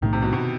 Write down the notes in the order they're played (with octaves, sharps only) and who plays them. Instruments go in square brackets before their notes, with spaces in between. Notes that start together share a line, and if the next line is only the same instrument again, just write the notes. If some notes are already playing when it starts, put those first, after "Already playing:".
[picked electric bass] B1 A2 F#3 A3 [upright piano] D#3
[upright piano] C3
B2
B2